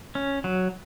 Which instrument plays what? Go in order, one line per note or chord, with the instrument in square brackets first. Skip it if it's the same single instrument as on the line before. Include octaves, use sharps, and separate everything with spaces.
[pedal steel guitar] C#4
F#3